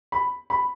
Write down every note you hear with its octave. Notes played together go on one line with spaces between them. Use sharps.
B5
B5